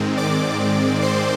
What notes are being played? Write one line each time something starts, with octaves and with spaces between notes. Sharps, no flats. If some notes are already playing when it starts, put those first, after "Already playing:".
Already playing: G#2 D#3 G#3 C4
D5 D6
C5 C6